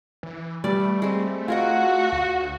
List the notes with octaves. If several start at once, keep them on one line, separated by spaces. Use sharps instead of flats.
E3
G3 A3 B4 D5
G#3 C4
F4 F#4 G#4 A#4 D#5
D2